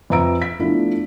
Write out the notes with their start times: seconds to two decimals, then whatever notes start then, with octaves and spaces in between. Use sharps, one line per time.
0.10 F2 B4 E5 A#5 E6 D7
0.42 B6
0.59 F3 A3 B3 D4 E4 F#4